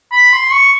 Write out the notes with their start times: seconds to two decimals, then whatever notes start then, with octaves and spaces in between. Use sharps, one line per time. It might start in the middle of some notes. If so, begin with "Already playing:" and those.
0.12 B5
0.32 C6
0.52 C#6